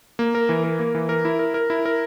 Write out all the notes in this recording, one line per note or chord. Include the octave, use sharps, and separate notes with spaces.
A#3
A#4
E3
A#4
A#3
E3
A#4
E4
A#4
A#4
E4
A#4